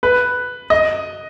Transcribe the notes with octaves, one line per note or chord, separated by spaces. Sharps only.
B4
D#5